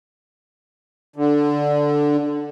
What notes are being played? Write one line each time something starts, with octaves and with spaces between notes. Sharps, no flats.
D3